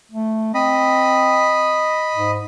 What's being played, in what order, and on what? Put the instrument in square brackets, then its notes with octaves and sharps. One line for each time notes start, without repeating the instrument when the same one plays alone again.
[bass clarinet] A3
[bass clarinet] C4 [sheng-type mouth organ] D#5 B5
[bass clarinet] G#2